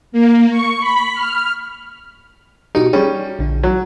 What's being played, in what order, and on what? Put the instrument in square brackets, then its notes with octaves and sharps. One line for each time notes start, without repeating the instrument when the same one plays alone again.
[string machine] A#3
C#6
B5
F6
[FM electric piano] B2 F#4 G4 [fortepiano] D#4
[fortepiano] G3 C#4 [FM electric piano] G#4
[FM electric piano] A#1 D3
[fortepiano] F#3